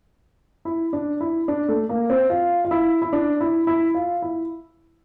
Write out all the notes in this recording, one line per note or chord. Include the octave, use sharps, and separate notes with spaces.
E4
D4
E4
D4
A3
A#3
C4
F4
F4
E4
E4
D4
E4
E4
F4
E4